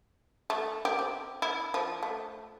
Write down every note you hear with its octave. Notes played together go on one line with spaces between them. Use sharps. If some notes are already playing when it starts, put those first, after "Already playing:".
A3
G4
C4
E4
F3
A3